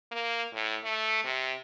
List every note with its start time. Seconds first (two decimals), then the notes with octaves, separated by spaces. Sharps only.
0.11 A#3
0.53 A2
0.84 A3
1.24 C3